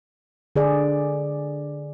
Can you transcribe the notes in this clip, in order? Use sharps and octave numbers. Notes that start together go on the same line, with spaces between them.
D3 G#4 D5